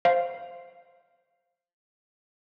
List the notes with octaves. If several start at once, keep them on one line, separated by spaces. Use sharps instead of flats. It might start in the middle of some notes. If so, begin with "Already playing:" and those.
C5 F5